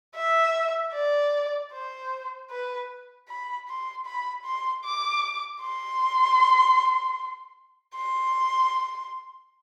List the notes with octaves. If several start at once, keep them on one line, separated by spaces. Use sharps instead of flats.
E5
D5
C5
B4
B5
C6
B5
C6
D6
C6
C6